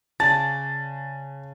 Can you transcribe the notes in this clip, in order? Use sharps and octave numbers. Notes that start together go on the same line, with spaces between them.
C#3 D5 A5 A6